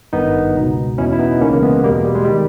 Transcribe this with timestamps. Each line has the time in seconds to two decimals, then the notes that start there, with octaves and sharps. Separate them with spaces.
0.13 G#1 G2 D#3 B3 D#4
0.55 C#2 B2
0.98 E2 B2 C#4 E4
1.12 E4
1.19 B3 D#4
1.41 C#2 C#3 E3 A#3 C#4
1.52 A#3
1.62 G#3 B3
1.83 B2 G3 A#3
1.87 E2
1.94 G#3
2.04 G3
2.15 G#3
2.25 D#3 G3